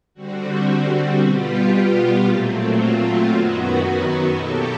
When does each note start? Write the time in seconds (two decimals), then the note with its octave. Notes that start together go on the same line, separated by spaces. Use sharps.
0.14 D3 G3 C4 F#4
1.19 B2 G3 B3 F4 G4
1.72 F4 G4
2.24 A#2 F#3 A3 C4
2.76 F4
3.28 F#2 D#3 F#3 B3 F#4
4.33 B2 F#3 A#3 G4 A4